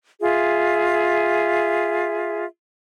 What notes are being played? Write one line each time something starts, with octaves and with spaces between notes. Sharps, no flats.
F4 G#4 E5